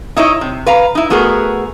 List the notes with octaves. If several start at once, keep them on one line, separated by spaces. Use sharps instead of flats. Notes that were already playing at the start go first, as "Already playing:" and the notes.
D#4 E4 C#5 D#5
C3
B4 F5 A#5
D#4 E4
A3 B3 F#4 G#4 A#4